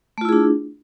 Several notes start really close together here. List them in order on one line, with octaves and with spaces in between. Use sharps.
A3 F4 E4 G#4 D4